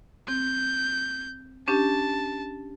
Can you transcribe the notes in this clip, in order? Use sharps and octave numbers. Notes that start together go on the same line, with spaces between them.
C4 G6
C#4 D4 G4 A5